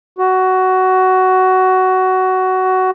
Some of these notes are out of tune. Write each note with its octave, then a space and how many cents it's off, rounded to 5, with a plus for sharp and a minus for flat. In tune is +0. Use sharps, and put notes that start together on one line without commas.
F#4 +15